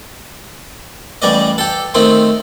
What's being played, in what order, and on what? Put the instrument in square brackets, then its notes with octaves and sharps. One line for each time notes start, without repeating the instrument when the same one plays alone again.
[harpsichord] A1 G3 D5 D#5
G4 A4
D#3 A3 C4 C6